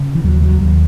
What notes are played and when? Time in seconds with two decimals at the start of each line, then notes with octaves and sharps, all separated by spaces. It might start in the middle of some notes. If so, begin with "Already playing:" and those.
Already playing: C#3
0.15 E3
0.24 D#2 F#3
0.42 F#3
0.61 D#2 F#3